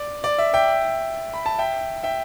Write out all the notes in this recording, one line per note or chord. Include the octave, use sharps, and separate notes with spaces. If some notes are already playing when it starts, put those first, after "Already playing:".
Already playing: D5
D5
E5
E5 G5
B5
A5
E5 G5
E5 G5